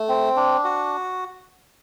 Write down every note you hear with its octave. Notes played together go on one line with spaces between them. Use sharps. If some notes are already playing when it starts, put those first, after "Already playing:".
Already playing: A3
C4
D4
F#4